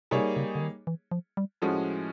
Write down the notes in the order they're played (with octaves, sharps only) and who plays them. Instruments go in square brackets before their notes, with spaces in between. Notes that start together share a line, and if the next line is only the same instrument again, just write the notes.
[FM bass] C3 [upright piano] G3 A#3 D#4 G#4 C#5
[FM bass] C#3
D3
D#3
E3
F3
G3
[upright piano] A2 F3 G#3 C#4 F#4